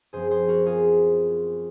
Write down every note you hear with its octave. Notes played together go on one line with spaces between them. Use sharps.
F#2 F3 C4 G#4 C5
G#4 C5
F#4 A#4
F4 G#4